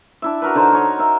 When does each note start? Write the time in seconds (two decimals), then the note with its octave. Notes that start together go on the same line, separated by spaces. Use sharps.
0.22 D4 E4 E5
0.42 F#4 A#4 B4
0.55 D3 D#4 C5
0.72 D#4 C#5 D#5
0.99 A#4 D#5 E5